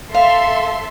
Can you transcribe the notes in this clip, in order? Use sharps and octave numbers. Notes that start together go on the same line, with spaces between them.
A4 E5 F5 C6